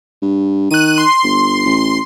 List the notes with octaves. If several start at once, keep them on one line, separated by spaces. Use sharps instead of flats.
G2
D#3 F#6 D#7
C6
G1
A1